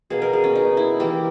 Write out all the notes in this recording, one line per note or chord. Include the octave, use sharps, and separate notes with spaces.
B2 A#3 G#4
A#4
G#4
C#4
D#4
E4
E3 A#3 G4